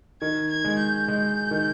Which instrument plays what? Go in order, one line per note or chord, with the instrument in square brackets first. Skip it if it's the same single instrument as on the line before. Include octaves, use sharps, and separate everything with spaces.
[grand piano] D#3 [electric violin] G#6
[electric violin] G#6
[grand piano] G#3
[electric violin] G6
[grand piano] G#3
D#3